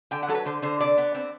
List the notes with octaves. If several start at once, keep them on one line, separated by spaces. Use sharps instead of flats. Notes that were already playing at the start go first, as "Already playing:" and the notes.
D3 G5
F#5
F#3 A4
B4
D3 C5
D3 C5
C3 D5
B3
C4